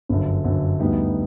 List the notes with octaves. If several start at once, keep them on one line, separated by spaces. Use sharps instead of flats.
G1 F#2 D3
G1 F#2 D3
D2 D3 G3 B3 D#4